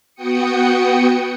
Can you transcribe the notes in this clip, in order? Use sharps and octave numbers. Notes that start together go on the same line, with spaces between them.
B3 F#4 G5 D#6 C#7